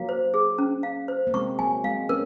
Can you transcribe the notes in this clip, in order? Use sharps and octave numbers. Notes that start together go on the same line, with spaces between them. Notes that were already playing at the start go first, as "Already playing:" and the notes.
Already playing: F#3 A#3 F5
C5
G#4
C#4
F5
C5
A#3
G#3 C4 C#6
F#3 A#3 G#5
G#3 C4 F5
A#3 C#4 A#4